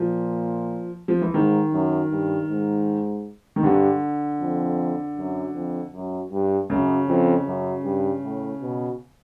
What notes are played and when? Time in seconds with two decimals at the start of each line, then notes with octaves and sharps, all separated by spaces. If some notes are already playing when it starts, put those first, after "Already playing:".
Already playing: A#2 F3
1.08 F3
1.22 E3
1.33 G#2 D#3
1.73 F#2
2.11 G2
2.49 G#2
3.56 D#3
3.63 G2 D3
4.41 F2
5.17 F#2
5.54 F2
5.93 F#2
6.32 G2
6.70 F#2 C#3
7.08 F2
7.46 F#2
7.84 G2
8.23 A2
8.62 B2